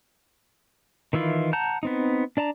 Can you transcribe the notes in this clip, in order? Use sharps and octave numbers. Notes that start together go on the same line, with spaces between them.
D#3 E3 E4 F4
F#5 A5 A#5 G6
B3 C4 D#4
D4 D5 A5 A#5